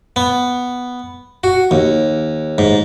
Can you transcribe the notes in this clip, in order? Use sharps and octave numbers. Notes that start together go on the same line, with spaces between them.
B3
F#4
D#2
G#2